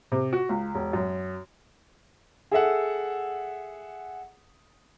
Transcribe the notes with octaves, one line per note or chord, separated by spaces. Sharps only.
C3
F#4
C#2
E1
F#2
G#4 A4 E5 F#5